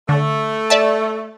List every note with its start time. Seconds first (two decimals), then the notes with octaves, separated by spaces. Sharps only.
0.09 D3 A3
0.70 D5 E5 A5